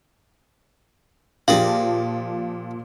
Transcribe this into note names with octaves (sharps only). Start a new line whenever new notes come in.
A#2 F3 G4 G#4 D5 F5